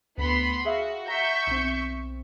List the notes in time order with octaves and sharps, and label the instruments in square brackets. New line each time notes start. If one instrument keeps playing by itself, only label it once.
[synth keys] D2 [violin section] B3 B5 C6
[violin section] F#4 [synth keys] G#4 E5 F5
[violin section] E5 C#6 G6 [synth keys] F#5 A#5 A#6
[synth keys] B1 C4